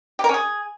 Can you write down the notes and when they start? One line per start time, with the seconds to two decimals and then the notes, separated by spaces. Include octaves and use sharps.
0.19 G4
0.24 A#4
0.29 C#4
0.34 G#4